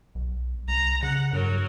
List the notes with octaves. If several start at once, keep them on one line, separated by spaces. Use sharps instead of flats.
B1
C2 A#5
C#3 F#5
G2 F#3 A#4